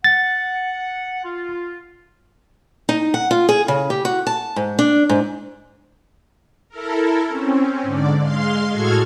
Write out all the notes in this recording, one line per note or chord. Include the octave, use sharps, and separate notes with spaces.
F#5 A6
F4
D#4
F#5
F4
G#4
C#3
G4
F#4
A5
G#2
D4
G#2
E4 A4 A#4
C4 C#4
G#2 D3 D5
G#3 F5 C6
A2 G#3 F#4 A4 F6 G#6